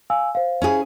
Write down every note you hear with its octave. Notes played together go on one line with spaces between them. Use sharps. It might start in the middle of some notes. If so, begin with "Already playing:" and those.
F5 G#5 E6
C5 F5
C#4 E4 G#4